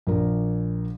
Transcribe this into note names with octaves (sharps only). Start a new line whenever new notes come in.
A#1 A#4